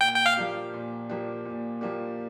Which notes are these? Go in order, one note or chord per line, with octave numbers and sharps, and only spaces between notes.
A#2 G5
G5
F5
F3 A#3 D4 G4
A#2
F3 A#3 D4 G4
A#2
F3 A#3 D4 G4